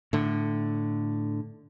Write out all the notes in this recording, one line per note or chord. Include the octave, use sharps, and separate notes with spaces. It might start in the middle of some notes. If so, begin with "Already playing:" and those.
A2 D3